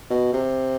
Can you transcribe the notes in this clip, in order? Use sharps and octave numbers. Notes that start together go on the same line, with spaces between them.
B2
C3